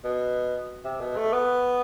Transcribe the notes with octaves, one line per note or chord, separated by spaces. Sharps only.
B2
C3
B2
A3
B3